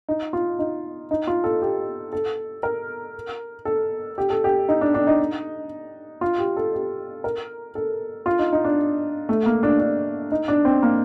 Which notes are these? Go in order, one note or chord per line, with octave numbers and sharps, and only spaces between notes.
D#4
F4
D#4
D#4
F4
A4
G4
A4
A#4
A4
G4
A4
G4
D#4
D4
D4
D#4
F4
G4
A4
G4
A#4
A4
F4
D#4
D#4
D4
A3
A#3
D4
D4
D#4
D4
C4
A#3